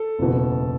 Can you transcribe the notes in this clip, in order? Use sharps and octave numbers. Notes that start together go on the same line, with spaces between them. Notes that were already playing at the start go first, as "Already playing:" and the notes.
Already playing: A4
F#1 E2 B2